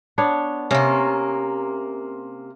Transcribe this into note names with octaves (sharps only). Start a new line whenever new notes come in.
B3 D4 C#5
C3 A#3 C#4